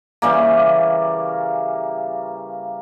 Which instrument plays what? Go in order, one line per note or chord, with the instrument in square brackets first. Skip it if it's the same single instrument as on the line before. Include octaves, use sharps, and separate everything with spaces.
[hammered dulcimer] C#3 E3 G3 A#3